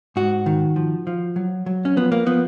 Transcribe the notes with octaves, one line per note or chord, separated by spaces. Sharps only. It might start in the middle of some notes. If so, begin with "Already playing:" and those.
G#2 F#4
D#3
F3
F3
F#3
F#3
C#4
F3 B3
A#3
F3 B3